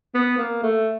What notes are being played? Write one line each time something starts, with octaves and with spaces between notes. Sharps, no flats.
B3
A#3
A3